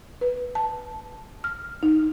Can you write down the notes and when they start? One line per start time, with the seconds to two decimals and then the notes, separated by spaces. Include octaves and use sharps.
0.21 B4
0.55 A5
1.44 F6
1.83 D#4